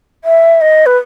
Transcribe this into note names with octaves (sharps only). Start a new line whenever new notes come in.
E5
D#5
B4